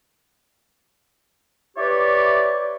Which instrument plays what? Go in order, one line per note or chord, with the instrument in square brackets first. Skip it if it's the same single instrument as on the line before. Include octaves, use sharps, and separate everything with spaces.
[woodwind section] E4 G4 B4 C#5 D5